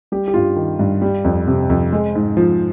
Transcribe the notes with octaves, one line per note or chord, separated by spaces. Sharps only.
G3 G4
G4
G2 F4
D#3
G2
G3
F2
C3
F2
G#3
G#2
F3